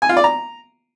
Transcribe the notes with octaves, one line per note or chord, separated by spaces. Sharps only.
G#5
F4
D5
A#5